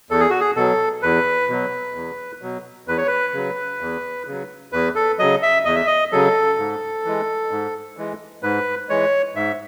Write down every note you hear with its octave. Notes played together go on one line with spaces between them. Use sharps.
E2 A4
G#4
F#4
G#4
B2 F#3 A4
E2 B4
B2 F#3
E2
B2 F#3
E2 B4
C#5
B4
C#3 F#3
E2
C#3 F#3
E2 B4
A4
C#3 F#3 D#5
E5
E2 D#5
E5
D#5
C#3 F#3 A4
G#2
E3 G#3
G#2
E3 G#3
G#2 B4
E3 G#3 C#5
G#2 E5